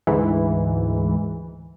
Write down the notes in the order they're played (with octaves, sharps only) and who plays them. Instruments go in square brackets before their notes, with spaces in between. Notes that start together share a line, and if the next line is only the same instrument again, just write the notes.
[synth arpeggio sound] D2 G#2 E3